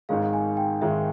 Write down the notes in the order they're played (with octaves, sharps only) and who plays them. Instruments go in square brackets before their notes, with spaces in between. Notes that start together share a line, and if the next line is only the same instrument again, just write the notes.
[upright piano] G#1 G#2 D#3 G#3 [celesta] F5
[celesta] G#5
G5
[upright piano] G#1 G#2 D#3 G#3 [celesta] E5